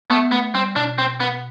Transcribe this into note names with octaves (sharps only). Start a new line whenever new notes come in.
A3 B3
A3 B3
G3 C4
B2 D4
C4
B3